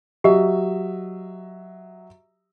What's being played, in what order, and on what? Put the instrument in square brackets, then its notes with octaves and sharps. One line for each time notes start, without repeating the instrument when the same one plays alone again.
[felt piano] F#3 D#5 E5 [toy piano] G4